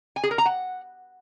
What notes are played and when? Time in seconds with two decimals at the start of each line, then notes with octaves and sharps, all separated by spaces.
0.16 G#5
0.23 G#4
0.31 A#4
0.38 A#5
0.46 F#5